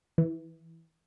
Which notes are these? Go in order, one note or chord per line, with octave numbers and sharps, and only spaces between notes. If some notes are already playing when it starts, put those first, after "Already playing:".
E3